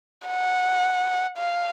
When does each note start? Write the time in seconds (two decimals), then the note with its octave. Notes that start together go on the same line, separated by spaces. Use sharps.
0.27 F#5
1.37 F5